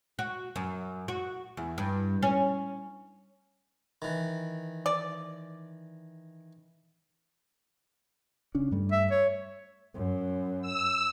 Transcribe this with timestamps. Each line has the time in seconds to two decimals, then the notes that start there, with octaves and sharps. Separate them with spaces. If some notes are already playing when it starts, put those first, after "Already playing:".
0.19 F#4
0.56 F#2
1.08 F#4
1.57 E2
1.78 G2
2.22 C#4
4.02 D#3 E3
4.86 D5
8.55 C#3 C#4 D4
8.71 G2 G3 A3
8.92 E5
9.11 C#5
9.95 F#2
10.62 E6